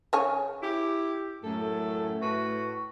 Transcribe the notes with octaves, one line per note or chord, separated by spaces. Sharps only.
C#3 C#5 G#5
E4 G4
F#2 A2 A3 A4
A2 F#4 B4